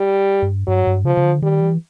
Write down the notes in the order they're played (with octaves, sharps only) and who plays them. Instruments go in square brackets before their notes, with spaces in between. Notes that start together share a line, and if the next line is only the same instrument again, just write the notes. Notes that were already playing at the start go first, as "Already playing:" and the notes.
Already playing: [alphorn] G3
[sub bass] G2
[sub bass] G2 [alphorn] F#3
[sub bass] G2
[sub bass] C#3 [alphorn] F3
[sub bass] C#3
D3
[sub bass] D#3 [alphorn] G3
[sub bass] E3